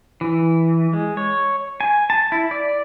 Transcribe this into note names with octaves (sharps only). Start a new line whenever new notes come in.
E3
G#3
C#5
G#5
A5
E4
D5